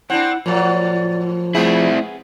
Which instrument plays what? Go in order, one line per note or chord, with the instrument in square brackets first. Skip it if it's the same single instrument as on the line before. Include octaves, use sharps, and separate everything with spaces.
[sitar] C4 D4 [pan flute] E4 [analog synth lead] F#5
[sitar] A2 F#3 [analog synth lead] F3 [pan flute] D5
[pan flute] A3 [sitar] B3 G#4 [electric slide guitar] C4 E4